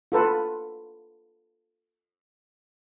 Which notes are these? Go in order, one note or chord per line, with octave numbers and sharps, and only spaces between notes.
F4 A4 B4